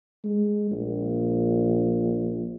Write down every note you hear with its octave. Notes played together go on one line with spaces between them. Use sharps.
G#3
A#1